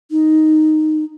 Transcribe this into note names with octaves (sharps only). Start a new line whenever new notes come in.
D#4